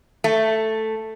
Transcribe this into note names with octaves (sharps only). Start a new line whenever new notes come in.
A3